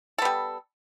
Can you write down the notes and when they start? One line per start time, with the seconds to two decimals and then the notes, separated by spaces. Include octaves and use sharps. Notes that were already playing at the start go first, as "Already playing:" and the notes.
0.18 A4
0.22 B3
0.25 G3